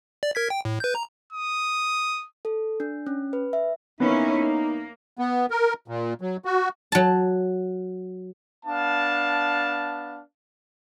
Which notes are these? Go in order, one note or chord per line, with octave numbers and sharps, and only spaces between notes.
D5
A#4 G#6 B6
G5
A2
B4 G6
A#5
D#6
A4
D4
C#4
B4
E5
A#3 B3 C#4 D#4 E4
A#3
B3
A#4
A#2
F#3
F#4
F#3 A5
B3 D4 F5 A5